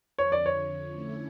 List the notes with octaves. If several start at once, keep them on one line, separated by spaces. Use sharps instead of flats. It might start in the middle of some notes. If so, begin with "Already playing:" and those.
F2 D3 F3 C#5
D5
C#5
D3 A3 C#4 E4